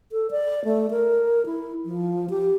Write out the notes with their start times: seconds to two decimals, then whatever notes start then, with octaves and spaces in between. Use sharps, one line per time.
0.12 A4
0.31 D5
0.65 A3
0.91 A#4
1.46 E4
1.85 F3
2.30 G4